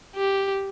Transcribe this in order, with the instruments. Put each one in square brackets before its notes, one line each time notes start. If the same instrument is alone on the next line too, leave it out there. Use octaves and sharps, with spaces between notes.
[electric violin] G4